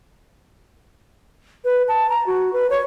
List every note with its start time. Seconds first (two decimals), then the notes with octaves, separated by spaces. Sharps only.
1.65 B4
1.88 A5
2.09 A#5
2.26 F#4
2.53 B4
2.70 C#5